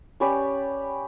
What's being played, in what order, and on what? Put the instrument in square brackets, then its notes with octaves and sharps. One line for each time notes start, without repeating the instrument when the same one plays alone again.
[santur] C#4 G4 B4 D5